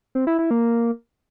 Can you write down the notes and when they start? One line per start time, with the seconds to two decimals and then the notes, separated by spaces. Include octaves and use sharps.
0.15 C4
0.27 E4
0.39 E4
0.51 A#3